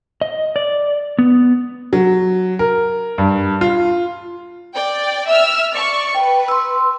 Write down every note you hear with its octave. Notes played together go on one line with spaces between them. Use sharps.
D#5
D5
B3
F#3
A#4
G2
F4
D5 G5
E5 E6 F6
D5 C#6
B4 G5
C6 E6